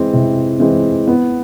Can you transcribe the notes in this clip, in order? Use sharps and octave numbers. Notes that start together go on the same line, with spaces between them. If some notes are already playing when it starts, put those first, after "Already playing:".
Already playing: E3 G#3 C4
C3
E3 G#3 C4
B3